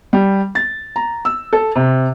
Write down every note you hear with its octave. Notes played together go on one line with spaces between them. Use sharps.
G3
A6
A#5
E6
A4
C3